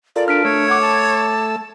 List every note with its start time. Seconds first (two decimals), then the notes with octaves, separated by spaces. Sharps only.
0.16 F4 A4 A#4 D5
0.28 D4 F6 B6 D7
0.45 A3 C#5 E6
0.68 F#5 D6 G#6
0.81 A5